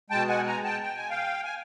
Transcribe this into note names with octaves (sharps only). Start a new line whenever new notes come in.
B2 G#3 G5 A5
F#5 G#5
G#5 A#5
G5 A5
G5
G#5
F5 G5
G#5